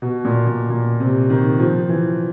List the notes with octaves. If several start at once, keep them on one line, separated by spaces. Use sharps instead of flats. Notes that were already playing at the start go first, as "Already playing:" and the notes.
B2
A#2
A#2
A#2
C3
D#3
F3
E3